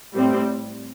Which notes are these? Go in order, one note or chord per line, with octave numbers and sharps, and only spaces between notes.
A2 G3 C4